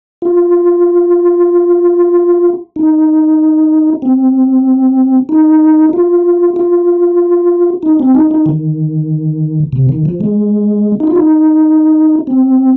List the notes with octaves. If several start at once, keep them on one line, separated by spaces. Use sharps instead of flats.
F4
D#4
C4
D#4
F4
F4
D#4
C4
D#4
D#4
D#3
C3
D#3
F3
G#3
D#4
F4
D#4
C4